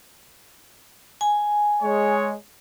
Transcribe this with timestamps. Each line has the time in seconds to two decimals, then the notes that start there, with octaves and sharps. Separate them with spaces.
1.21 G#5
1.82 G#3 C#5